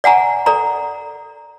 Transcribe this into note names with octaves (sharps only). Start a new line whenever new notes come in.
D5 F#5 G#5 A#5
A4 D5 A#5